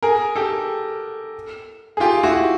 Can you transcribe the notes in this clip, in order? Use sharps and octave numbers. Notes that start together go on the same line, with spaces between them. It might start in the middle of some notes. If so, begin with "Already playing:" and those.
G#4 A#4
G4 A4
G#4
F4 G4
E4 F#4